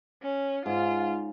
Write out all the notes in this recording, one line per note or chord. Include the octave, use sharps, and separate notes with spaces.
C#4
G#2 F4